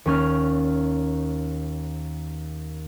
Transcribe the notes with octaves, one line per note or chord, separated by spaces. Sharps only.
D#2 C#4 F6